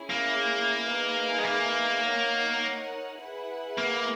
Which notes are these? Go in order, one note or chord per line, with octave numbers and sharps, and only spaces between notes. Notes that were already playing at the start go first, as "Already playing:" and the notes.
Already playing: C#4 E4 G#4
A#3
D#4 G#4 B4 E5 G#5
G#3
A#3
D#4 A#4 C#5 F#5
E4 G#4 B4 F#5
A#3